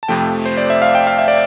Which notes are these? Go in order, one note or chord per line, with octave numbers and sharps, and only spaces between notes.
A5
F2 C3 F3 A3 G5
C5
D5
E5
F5
G5
F5
E5
D5